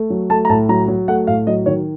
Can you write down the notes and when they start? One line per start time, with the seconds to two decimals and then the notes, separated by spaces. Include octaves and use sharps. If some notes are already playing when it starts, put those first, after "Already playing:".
Already playing: A3
0.10 F#3
0.30 A3 A5
0.45 A#5
0.49 A2 A5
0.69 F#3 A#5
0.88 F#3
1.08 A3 F#5
1.27 A2 F5
1.47 F#3 D#5
1.66 D#3 C#5